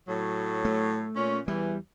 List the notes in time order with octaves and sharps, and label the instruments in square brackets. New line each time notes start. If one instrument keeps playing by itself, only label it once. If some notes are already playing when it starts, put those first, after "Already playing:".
[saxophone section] A2 F#3
[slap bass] A3
[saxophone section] A#2 C#4
[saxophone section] E2 E3 [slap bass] G3